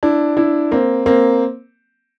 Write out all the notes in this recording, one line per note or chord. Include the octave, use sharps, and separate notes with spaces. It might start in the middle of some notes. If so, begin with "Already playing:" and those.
D4 E4
D4 E4
A#3 C4
A#3 C4